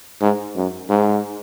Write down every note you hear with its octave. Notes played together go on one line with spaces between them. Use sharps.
G#2
F#2
G#2